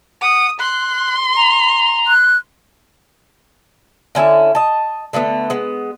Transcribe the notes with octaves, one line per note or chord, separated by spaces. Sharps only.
F#5 D#6
C6 F#6
A#5
F#6
D3 C#4 E4 E5
D#5 A5
D3 G#3 A3 B3
G#3 B3